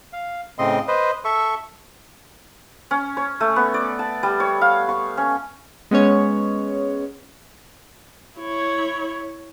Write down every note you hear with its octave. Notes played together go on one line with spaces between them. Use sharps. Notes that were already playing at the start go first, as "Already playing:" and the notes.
F5
A2 C#3 C4 D#5 C6
B4 C5 D#5
A4 E5 C#6
C#4
C#5
A3
B3
D5
A5
G3
C#5
F5
C#6
C#4
G#3 B3 C#4 C#5
E4 C#5